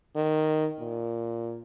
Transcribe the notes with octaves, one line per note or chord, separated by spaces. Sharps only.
D#3
A#2